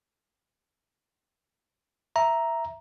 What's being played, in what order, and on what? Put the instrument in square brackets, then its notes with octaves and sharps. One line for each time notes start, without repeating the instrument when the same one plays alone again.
[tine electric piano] E5 A#5